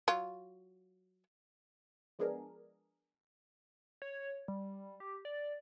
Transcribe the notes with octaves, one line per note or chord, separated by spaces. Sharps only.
F#3 F4
F3 G#3 B3 D4 G#4 A#4
C#5
G3
G4
D5